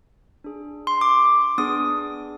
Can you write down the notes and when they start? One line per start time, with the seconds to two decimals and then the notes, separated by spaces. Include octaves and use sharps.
0.44 D4 G#4
0.87 C6
1.01 D6
1.58 B3 D4 G#4 D#6